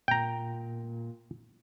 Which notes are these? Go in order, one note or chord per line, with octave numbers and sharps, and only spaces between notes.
A#2 G5 A#5